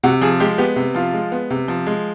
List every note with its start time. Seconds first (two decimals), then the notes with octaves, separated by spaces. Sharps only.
0.03 C3 F#4
0.21 F3 G#4
0.40 G#3 G4
0.58 B3 G4
0.76 C3
0.95 F3 F4
1.13 G#3
1.32 B3
1.50 C3
1.68 F3
1.86 G#3